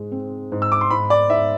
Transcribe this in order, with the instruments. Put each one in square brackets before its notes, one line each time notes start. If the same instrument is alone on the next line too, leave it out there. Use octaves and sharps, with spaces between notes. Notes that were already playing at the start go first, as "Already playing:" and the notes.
Already playing: [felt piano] G#2 G#3
C4
G#2
[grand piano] E6
D6
C6
[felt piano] G#2 [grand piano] B5
[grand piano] D5
[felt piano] G#2 [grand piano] E5